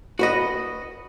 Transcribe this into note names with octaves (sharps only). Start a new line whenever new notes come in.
F#4 B4 D#5